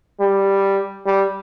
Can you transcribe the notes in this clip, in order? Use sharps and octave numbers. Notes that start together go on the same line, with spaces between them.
G3
G3